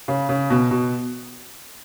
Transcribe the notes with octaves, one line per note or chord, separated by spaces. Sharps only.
C#3
C#3
B2
B2